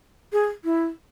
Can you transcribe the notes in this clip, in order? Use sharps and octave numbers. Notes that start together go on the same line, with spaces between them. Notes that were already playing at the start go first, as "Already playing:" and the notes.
G#4
E4